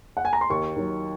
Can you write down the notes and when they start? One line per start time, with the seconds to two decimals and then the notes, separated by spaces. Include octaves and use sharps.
0.17 F#5
0.25 G#5
0.33 A#5
0.41 C6
0.50 D#2 C#6
0.76 D#3 F#3